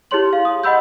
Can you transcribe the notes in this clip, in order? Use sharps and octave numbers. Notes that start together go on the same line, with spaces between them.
E4 G4 G#4 C#5 C6 F#7
F5
D#6
D#5 F#5 B5 E6 G6